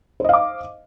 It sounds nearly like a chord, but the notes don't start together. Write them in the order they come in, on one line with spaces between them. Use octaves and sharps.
C5 D#5 F5 D6